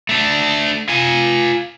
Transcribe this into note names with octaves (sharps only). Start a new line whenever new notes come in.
A3 D4
F4 G#5